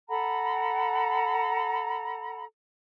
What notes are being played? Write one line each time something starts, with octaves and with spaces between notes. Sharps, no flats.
A4 F#5 A#5 B5